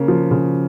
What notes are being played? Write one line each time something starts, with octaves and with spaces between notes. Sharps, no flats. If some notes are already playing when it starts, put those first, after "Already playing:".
Already playing: C#3 A#3
F3
C#3